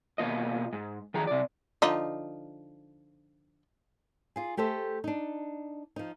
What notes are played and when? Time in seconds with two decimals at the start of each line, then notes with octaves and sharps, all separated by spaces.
0.18 B2 A#3 F4 D#5
0.73 G#2
1.14 D#3 F3 G#4 A#5
1.27 C3 D5
1.82 D3 F3 D#4
4.36 F4 G#4
4.57 A3 G4 A4 C5 E5
5.04 D4 D#4
5.96 F3 D#4